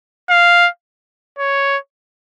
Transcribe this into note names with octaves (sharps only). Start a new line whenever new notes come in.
F5
C#5